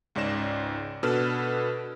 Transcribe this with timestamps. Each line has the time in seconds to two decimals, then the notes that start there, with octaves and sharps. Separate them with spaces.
0.15 C#2 G#2 C#4 D5 A#6 E7
1.03 B2 D4 A4 B4 F6 E7